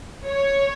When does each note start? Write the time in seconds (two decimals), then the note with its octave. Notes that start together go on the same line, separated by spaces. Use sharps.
0.26 C#5